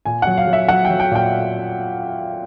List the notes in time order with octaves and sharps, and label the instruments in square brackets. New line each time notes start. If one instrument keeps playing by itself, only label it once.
[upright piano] A#2 G#5
F#3 F#5
F5
F#3
E5
F#3 F#5
G5
F#3
G5
A#2 G5